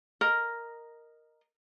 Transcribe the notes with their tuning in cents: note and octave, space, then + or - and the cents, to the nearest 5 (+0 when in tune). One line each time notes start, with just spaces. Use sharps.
A#4 +0 D#5 -5